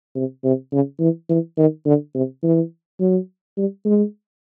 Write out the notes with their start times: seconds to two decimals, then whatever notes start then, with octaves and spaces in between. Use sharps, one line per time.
0.15 C3
0.44 C3
0.72 C#3
1.00 E3
1.29 E3
1.57 D#3
1.86 D3
2.15 C3
2.43 E3
3.00 F#3
3.57 G3
3.85 G#3